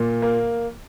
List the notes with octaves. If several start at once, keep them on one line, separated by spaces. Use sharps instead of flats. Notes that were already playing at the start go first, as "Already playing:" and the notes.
Already playing: A#2
A#3